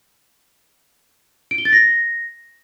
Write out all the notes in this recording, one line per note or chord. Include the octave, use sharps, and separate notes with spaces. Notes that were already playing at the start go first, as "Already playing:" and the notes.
D7
G7
A6
A#6